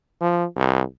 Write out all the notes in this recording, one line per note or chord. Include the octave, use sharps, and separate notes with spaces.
F3
C2